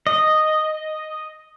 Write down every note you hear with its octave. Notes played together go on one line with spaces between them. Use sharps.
D#5